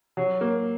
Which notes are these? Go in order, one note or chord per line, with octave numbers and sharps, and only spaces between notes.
F#3
A#3